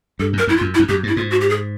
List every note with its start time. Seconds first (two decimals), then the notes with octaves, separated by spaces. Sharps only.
0.19 G2 A4
0.33 F#2
0.38 A#4
0.47 F2 E4
0.57 F4
0.61 F#2
0.75 E4
0.79 F2
0.89 F#2 G4
1.03 G2 E4
1.17 G#2 F4
1.31 F#4
1.41 G4
1.50 G#4